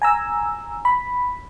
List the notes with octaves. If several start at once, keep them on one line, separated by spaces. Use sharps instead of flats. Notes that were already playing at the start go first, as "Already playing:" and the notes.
G#5 A#5 E6
B5